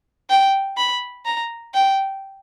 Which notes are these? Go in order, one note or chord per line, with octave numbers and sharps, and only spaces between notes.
G5
B5
A#5
G5